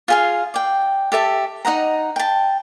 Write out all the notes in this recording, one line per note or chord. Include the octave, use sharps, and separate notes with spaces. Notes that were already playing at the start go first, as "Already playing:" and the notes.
F4 G#4 F5
D5 G5
G4 A4 E5 A5
D#4 D#5 F#5 A#5
G5 A5